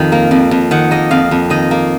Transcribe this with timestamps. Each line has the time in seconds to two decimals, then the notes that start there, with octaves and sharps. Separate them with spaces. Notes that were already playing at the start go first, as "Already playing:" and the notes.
Already playing: F2 D#3
0.12 A#3
0.31 F2
0.51 F2
0.71 D#3 F#5
0.91 A#3 D#5
1.11 F2 F5
1.31 F2
1.50 D#3 D#5
1.71 A#3